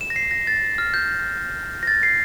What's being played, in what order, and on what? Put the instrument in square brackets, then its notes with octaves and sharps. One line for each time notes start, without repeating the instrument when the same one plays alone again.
[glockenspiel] E7
A#6
C7
A#6
A6
F6
G6
A#6
A6
C7